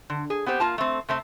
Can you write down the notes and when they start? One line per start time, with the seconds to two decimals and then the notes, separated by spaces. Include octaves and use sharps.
0.10 D3
0.30 G#4
0.46 B3 C4 G4 C5
0.60 A#3 F4 A5
0.78 A3 C4
1.08 C3 A3 C4